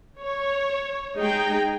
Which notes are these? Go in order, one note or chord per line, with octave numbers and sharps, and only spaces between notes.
C#5
G#3 D#4 G#4 G5